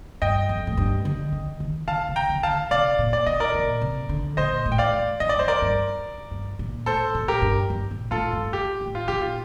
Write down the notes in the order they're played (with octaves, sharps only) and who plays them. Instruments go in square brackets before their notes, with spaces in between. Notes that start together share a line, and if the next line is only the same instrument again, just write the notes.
[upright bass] G2 [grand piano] D#5 G5
[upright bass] F2
A2
G2
D3
D3
D#3
[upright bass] D3 [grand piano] F5 A5
[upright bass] C3
[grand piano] G5 A#5
[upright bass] D3
[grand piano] F5 A5
[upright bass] D#3
[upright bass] C3 [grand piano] D5 F5
[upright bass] A#2
[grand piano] D5
[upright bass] A#2 [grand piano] D#5
[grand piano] A#4 D5
[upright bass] A#2
C3
D3
[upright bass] A#2 [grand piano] C5 D#5
[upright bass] A2
[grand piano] G5
D5 F5
[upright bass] G2
[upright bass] G2 [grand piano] D#5
[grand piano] D5
[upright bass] F2 [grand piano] C5
[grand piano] A#4 D5
[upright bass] G2
G2
A#2
[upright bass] A2 [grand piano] A4 C5
[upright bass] A#2
[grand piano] G4 A#4
[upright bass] G2
G2
A#2
[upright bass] A2 [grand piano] F4 A4
[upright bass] G2
[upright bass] G2 [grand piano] G4
[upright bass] A2
[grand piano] F4
[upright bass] A#2 [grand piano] G4
[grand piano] F4